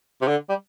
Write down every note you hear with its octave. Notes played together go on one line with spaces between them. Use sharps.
C3
D3
G3